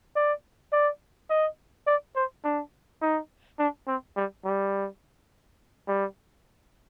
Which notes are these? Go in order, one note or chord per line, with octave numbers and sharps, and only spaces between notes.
D5
D5
D#5
D5
C5
D4
D#4
D4
C4
G3
G3
G3